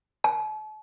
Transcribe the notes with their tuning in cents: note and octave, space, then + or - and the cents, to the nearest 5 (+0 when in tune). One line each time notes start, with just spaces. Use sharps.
A5 -40